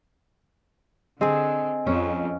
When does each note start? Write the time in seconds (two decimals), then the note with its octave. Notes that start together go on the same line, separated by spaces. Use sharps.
1.21 D3 C4 G#4 D#5 G#5
1.87 F2 C#4